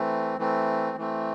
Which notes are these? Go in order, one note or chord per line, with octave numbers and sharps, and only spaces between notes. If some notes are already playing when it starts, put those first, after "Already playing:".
Already playing: E3 A3 C4
E3 A3 C4
E3 A3 C4